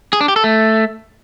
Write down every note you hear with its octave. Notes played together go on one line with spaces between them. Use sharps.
G#4
D4
G4
A4
A3